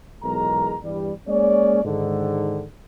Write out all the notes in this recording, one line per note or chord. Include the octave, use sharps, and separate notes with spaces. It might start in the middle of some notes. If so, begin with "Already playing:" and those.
B1 E2 G#3 A#4 A#5
E2 G2 G3
G#3 A#3 C#4 G#4 C#5 D5
G#2 D3 D#3